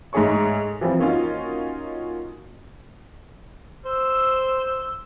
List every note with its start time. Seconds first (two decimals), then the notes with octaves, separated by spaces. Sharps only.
0.13 G#2 G#3 A3 G#4 C#5 C#6
0.81 E3 F3 G3 C4
0.99 A#3 C#4 D#4 F4 F#4
3.85 C5 E6